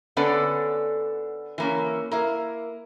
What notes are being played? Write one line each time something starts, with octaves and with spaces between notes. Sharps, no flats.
D3 B3 C#4 A4 B4 D5
E3 A#3 C#4
A#3 E4 A#4